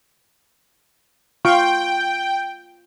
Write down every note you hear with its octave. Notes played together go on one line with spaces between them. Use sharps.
F4 F5 G5 C#6